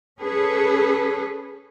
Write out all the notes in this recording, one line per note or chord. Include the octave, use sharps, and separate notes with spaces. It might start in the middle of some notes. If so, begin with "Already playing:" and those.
C#4 G#4 A4 B4